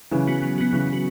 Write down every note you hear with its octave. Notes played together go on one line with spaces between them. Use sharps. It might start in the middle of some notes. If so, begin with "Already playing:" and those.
C#3 E3 F#3
B3 F#4
F#3
B3 F#4
C#3 E3 F#3
B3
F#4